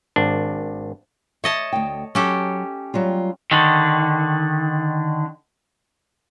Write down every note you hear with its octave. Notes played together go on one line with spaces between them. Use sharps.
G#1 D4
C#5 D#5 E5 A5
D2 G5
F#3 C#4 G4 A4
F#3 G3 F4
D3 D#3